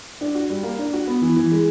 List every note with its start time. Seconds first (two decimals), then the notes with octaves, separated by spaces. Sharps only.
0.21 D4
0.35 F#4
0.50 G3
0.63 A#3
0.79 D4
0.93 F#4
1.07 B3
1.22 E3
1.36 E3
1.51 G#3